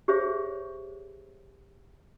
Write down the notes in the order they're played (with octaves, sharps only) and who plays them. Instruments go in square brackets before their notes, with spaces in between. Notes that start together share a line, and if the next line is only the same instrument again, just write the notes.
[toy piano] G4 G#4 C5 C#5 E5